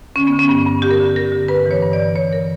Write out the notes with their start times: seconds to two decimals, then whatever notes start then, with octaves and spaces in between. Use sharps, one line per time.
0.16 D3 C#4
0.27 B3
0.33 D3
0.39 C#4
0.49 G2
0.66 G2
0.82 D3 G4
0.90 A#4
0.99 D3 G4
1.16 D3 A#4
1.32 D3
1.48 G2 B4
1.66 E3
1.71 C#5
1.82 G2
1.93 D5
1.99 E3
2.15 G2 C#5
2.31 E3 A#4